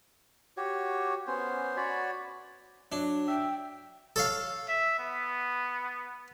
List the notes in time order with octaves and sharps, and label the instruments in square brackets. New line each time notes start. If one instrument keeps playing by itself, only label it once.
[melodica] F#4 G4 C#5
B3 C#4 C5
F#4 C#5 D5 B5
[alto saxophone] F#3 [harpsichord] D4
[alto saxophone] E5 [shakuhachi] G5
[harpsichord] A4 C#5 F5
[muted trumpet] E5
B3